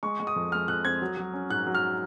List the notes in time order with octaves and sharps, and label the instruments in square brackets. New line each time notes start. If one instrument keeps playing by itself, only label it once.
[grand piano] G#3 C#6
G#3
D#6
F2
G#3 F6
F2 F#6
C4 G#6
F#3
F#3
C#4
G#2 F#6
F#3
F6